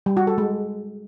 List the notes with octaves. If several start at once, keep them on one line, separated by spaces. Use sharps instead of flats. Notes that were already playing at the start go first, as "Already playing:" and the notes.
G3
F#4
A4
G#3